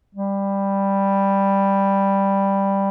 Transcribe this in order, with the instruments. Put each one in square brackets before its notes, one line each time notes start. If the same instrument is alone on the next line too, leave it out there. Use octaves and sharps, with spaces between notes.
[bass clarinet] G3